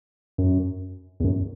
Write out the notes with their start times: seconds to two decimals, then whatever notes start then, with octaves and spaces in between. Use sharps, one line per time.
0.38 F#2
1.20 E2
1.24 F#2